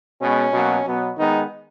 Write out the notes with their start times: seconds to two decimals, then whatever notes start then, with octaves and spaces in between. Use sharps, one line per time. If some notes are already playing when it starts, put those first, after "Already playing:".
0.20 B2 G#3 B3 C#4
0.53 B2 F#3 A#3
0.85 B2 F#3 B3
1.17 D#3 G#3 B3 D#4